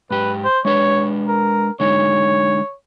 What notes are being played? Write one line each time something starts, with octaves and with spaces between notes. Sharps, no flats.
G#2 G4 B4
C5
G#3 D4 B4 C#5
A#4
D3 G#3 D#4 C#5